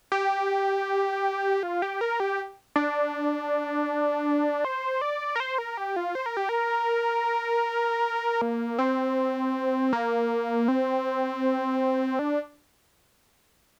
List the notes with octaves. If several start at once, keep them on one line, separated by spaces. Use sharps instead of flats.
G4
F4
G4
A#4
G4
D4
C5
D5
A#4
C5
A#4
G4
F4
C5
A#4
G4
A#4
A#3
C4
A#3
C4
D4